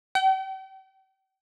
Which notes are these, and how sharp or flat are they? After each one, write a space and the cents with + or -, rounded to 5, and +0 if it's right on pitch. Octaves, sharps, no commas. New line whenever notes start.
G5 -40